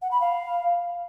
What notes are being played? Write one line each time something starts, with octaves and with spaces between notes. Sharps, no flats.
F#5
B5
F5